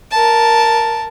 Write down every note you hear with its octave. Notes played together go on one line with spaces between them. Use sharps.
A#4 A5